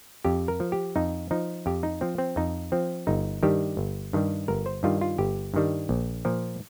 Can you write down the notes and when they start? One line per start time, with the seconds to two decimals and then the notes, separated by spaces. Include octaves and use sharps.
0.25 F2 G4
0.48 A#4
0.60 F3
0.72 G4
0.96 F2 D#4
1.31 F3 D#4
1.66 F2 G4
1.83 D#4
2.01 F3 C4
2.18 C4
2.36 F2 D#4
2.72 F3 C4
3.07 G1 D#4
3.43 G2 D#3 G3 G4
3.77 G1
4.13 G2 D#3 G3
4.48 G1 A#4
4.66 C5
4.83 G2 D#3 G3 F4
5.01 F4
5.18 G1 G4
5.54 G2 D#3 G3
5.89 A#1
6.25 A#2 F3